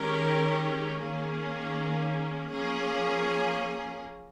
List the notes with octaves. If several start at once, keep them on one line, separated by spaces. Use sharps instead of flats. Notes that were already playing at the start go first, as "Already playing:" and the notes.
Already playing: D#3 G#3 C#4 G4 A#4
D#3 A#3 C#4 G#4
F3 A#3 C#4 G#4